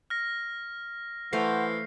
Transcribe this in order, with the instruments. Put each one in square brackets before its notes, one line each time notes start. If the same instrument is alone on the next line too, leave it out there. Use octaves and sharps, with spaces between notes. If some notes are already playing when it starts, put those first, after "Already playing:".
[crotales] F6 A#6
[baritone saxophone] E3 [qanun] A3 C5 F5 [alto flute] F#5 [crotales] C7